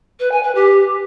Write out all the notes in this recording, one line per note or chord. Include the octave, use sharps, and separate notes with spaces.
B4
G#5
B4
G4